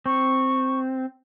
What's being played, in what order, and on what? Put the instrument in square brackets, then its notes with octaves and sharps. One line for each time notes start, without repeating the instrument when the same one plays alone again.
[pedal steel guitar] C4 [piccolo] C#6